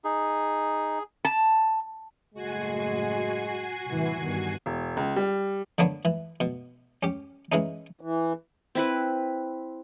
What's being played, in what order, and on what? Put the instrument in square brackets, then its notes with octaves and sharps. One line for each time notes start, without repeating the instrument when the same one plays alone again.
[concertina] D#4 [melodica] G#4
[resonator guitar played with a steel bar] A5
[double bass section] F#1 A2 [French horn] G#3 [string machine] F#4 G#5 C7
[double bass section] C2 A2 E3
E2 G2 D#3
[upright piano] E1
C#2
G3
[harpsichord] D3 A#3 B3 D4 C#5
E3
B2
C#4 G4
E3 G#3 C#4 D#4
[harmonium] E3
[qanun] C4 E4 B4